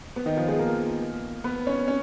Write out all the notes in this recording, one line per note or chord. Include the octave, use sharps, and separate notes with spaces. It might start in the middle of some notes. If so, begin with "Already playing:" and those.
B3
D#3 D#4
F3 F4
G#3 G#4
A#3 A#4
B3 B4
C#4 C#5
C#4